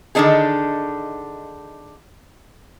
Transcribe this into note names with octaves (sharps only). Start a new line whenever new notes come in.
D3 D#3 B3 D4 D#4 G#4